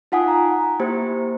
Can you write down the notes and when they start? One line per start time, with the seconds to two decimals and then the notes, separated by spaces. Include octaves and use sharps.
0.12 D#4 F4 F#5 G#5 D#6
0.28 A#5
0.80 A#3 E4 G4 C5